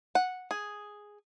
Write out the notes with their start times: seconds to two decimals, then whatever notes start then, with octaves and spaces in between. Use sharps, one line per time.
0.15 F#5
0.51 G#4